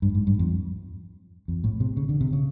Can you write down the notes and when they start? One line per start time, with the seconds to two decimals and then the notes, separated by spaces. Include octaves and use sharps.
0.02 G2
0.15 G#2
0.27 G2
0.39 F2
1.48 F2
1.64 A2
1.80 C3
1.97 C#3
2.09 D3
2.21 C3
2.33 C#3